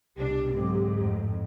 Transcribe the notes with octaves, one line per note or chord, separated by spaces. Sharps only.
C2 B2 D4 G4
G#2 D3 F#3 C4
F2 A2